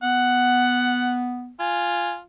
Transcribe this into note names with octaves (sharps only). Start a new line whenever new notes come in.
B3 F#5
F4 G#5